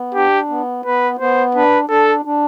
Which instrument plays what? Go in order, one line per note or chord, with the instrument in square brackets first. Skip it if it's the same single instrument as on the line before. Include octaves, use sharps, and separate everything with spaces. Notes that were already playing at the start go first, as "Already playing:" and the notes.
Already playing: [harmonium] B3
[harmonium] D4 [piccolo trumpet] G4
[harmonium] B3
[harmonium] B3 [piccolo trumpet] B4
[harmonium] B3 [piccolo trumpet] C5
[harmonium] D4 [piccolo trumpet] B4
[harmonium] D4 [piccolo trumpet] A4
[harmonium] D4